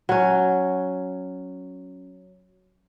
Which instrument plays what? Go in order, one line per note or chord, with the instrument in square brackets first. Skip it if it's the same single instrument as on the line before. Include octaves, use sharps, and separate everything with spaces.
[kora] F#3 C#4